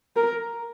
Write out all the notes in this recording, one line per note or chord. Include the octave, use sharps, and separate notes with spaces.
A#4